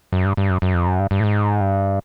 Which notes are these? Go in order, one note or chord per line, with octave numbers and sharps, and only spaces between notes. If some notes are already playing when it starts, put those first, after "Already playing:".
F#2
G2
G2
F#2
F#2
F2
F#2
G2
G2
A2
G#2
G2